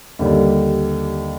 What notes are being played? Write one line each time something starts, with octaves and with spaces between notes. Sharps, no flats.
D#2 D3 G3